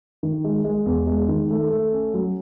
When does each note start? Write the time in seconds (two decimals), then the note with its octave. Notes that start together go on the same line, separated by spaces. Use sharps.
0.23 D#3
0.44 G#3
0.64 G#3
0.86 E2
1.07 G#3
1.29 D#3
1.50 A3
1.70 A3
1.92 C#4
2.14 F#3